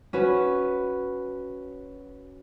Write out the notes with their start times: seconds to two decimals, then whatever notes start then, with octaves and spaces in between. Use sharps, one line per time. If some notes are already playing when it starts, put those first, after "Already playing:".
0.13 C#4 F#4 B4